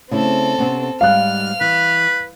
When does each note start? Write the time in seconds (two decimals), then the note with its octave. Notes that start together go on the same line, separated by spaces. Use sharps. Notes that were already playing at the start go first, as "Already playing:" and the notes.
0.11 C#3 A3 C4 E4 A4
0.59 C3 B3 C#4
1.01 G#2 G3 F5 F6 F#6
1.61 E3 B4